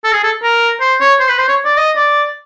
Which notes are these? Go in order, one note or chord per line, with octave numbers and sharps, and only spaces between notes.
A4
G#4
A4
A#4
C5
C#5
C5
B4
C5
C#5
D5
D#5
D5